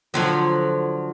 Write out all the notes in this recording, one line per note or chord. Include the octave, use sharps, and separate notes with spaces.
D3 F3 F#3